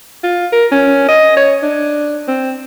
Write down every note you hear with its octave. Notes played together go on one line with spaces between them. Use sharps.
F4
A#4
C#4
D#5
C#5
D4
C4